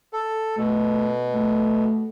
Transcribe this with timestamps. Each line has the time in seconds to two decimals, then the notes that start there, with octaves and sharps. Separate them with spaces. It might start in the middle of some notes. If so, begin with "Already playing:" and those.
0.13 A4
0.57 B2 A3
1.35 A3